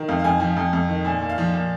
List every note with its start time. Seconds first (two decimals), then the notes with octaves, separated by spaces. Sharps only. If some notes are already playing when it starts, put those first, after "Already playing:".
Already playing: D#3
0.08 F2 F5
0.19 F5
0.24 F2 G#5
0.40 F3 G#5
0.57 F2
0.73 F2
0.89 D#3
1.05 A#2 G#5
1.21 A#2
1.29 F5
1.38 F3
1.53 A#2